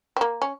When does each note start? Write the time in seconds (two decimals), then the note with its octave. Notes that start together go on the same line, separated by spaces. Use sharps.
0.16 C4
0.21 A#3
0.42 C#4